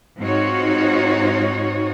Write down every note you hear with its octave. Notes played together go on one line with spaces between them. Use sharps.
G#2 C4 D#4 F4 F#4 C#5